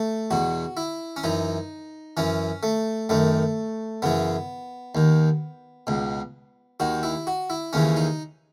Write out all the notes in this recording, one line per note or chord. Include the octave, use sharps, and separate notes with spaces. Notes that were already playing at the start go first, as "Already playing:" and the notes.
Already playing: A3
E2 B2 F#4
E4
C#4
F#2 E3 D#4
F#2 E3 C#4
A3
F#2 D#3 A3
F#2 C#3 E3 B3
D#2 D#3
C#2 B2
D#2 D#3 F#4
E4
F#4
E4
D#2 C#3 E3 C#4
D#4